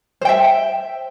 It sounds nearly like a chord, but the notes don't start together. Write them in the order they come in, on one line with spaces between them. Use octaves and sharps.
C5 G5 E5